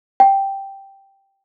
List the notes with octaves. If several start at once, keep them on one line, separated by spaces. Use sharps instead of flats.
G5